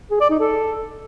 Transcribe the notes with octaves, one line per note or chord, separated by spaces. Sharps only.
G#4
D5
D#4
A4